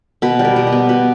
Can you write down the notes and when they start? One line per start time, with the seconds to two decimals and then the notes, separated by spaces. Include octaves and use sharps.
0.22 B2 B4
0.39 G3
0.45 A#4
0.56 B2
0.67 G4
0.72 B3
0.89 B2 B4